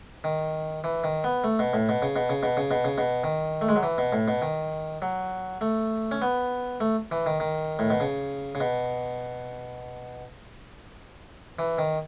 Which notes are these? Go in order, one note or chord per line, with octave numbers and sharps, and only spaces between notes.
D#3
E3
D#3
B3
A3
B2
A2
B2
C#3
B2
C#3
B2
C#3
B2
C#3
B2
D#3
A3
G#3
F#3
E3
B2
A2
B2
D#3
F#3
A3
C#4
B3
A3
E3
D#3
D#3
A2
B2
C#3
C#3
B2
E3
D#3